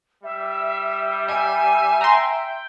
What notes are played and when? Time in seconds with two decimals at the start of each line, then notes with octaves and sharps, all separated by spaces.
0.24 G3 E5
1.29 E5 G#5
2.01 G5 A#5 C6